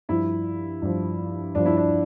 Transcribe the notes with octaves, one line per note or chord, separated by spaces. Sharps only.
G2 F3 E4
G2 F3
G2 F3 D4
E4
D4